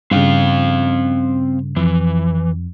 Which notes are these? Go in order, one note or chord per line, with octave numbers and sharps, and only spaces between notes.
G2 C#3 C4 F5 G5
F2 E3